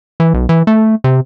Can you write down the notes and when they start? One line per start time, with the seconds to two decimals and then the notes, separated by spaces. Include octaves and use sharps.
0.20 E3
0.34 B1
0.49 E3
0.67 A3
1.04 C3